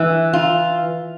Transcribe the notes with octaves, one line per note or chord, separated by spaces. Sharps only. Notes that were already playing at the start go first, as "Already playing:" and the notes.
Already playing: E3
F4